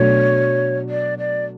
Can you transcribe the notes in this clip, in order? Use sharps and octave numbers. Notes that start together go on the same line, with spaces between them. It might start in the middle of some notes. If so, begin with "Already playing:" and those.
Already playing: B2 F#3 A3 D4 F#4 C#5
D5
D5